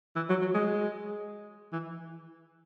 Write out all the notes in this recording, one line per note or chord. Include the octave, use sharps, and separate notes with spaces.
E3
F#3
F#3
G#3
E3